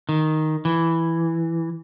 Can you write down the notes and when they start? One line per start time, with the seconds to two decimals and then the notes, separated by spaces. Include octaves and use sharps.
0.09 D#3
0.65 E3